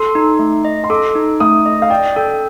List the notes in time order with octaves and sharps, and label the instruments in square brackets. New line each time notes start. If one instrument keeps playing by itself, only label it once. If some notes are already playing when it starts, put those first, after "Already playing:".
Already playing: [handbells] A4 [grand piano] C6
[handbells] D#4
A3
D#5
[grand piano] C6
[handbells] A4 [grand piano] D6
[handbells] D#4
[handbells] A3 [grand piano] D#6
[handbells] D#5
[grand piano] F5
[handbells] D5 [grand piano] G5
[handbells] A4 [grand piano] G5